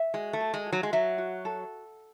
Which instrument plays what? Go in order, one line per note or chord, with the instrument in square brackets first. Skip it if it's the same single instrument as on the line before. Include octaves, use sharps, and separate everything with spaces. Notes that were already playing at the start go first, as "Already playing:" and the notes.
Already playing: [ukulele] E5
[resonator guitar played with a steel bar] G#3 [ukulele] F#4
[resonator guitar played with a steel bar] A3
[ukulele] A4
[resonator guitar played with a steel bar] G#3
[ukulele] F#4
[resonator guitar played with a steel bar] F#3
G#3
[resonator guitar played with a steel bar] F#3 [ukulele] E5
[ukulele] F#4
A4